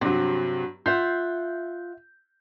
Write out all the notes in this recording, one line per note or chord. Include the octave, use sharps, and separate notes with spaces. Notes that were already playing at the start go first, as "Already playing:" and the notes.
G2 C3 F#3
F4 E5 F#5 G6